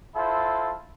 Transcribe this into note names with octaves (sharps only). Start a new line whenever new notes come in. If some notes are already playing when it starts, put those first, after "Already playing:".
E4 F4 A4 C5